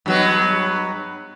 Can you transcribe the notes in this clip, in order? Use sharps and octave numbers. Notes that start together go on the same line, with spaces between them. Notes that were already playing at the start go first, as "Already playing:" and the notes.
G2 F#3 B3